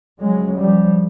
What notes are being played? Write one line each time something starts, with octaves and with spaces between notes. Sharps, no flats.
D2 C#3 F#3 G#3
F3 G3